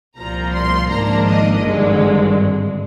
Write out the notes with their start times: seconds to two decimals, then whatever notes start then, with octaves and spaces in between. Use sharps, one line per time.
0.19 C2 A#2 F3 A#5
0.55 C6
0.91 G#1 G#2 F3 A#3 D4 A#5
1.27 D#5
1.63 G#1 G2 D3 G#3